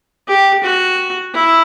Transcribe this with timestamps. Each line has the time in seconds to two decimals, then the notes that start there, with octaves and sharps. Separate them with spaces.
0.28 G4
0.63 F#4
1.34 E4